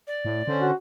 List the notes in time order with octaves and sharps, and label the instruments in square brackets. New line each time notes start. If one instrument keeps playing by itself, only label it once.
[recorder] D5
[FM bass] A2
[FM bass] D3 [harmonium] C#4 C5
[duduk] F#4